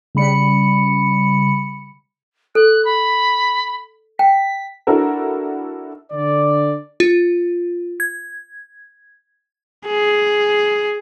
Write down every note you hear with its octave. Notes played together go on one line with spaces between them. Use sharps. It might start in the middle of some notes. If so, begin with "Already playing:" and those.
C#3 G3 B5 C#7
A4 F#6
B5
G5 B6
D4 E4 F#4 A4 A#4
D3 D5
F4
G#6
G#4